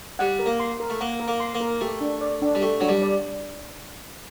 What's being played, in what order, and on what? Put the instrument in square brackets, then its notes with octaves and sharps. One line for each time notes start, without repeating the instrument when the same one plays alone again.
[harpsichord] G3 [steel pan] F#5
[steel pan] A#4
[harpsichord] A#3
[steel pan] C6
A#4
[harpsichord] A3
[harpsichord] A#3 [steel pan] F#5
[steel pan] A#4
[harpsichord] A#3
[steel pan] C6
[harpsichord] A#3
[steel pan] A#4
[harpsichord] A3 [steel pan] G4
[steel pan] D4
D5
D4
[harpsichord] G3
[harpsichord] A3 [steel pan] G4
[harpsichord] F#3 [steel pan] D4
[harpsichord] G3
[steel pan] D5